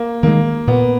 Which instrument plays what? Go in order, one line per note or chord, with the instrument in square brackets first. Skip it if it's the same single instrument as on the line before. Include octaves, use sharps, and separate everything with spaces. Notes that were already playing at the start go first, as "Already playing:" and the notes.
Already playing: [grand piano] A#3
[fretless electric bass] D#3 G#3 [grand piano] A#3
[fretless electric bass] A#2 [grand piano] B3